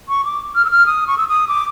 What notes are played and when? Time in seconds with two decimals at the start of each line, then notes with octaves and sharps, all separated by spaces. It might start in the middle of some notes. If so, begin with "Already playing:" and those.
0.09 C#6
0.25 D6
0.55 F6
0.65 E6
0.71 F6
0.86 D#6
1.07 C#6
1.18 E6
1.28 D#6
1.48 D6